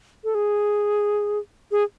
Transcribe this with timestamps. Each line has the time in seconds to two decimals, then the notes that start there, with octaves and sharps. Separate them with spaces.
0.24 A4
0.35 G#4
1.71 G#4